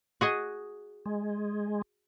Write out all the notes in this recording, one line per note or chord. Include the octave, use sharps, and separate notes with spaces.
F#4 G#4 D#5
G#3